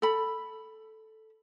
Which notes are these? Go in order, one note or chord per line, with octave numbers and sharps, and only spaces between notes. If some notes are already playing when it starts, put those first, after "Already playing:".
A4 B5